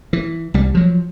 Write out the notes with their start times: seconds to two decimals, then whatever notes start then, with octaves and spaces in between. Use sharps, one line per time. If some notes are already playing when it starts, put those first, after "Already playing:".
0.13 E3
0.54 C2 G3
0.75 F3 F#3